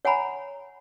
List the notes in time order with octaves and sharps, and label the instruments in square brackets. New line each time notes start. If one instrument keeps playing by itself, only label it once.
[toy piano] C#5 F#5 G#5 A#5 B5